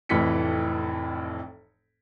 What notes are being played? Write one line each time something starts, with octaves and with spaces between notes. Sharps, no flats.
F1 F2 A2 E3 B6 C#7